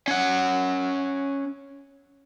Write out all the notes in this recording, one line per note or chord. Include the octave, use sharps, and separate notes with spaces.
C#4 F#5